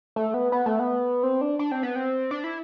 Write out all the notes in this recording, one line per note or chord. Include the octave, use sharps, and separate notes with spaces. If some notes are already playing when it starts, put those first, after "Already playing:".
A3
B3
B3
A3
B3
C4
D4
D4
C4
B3
C4
D4
E4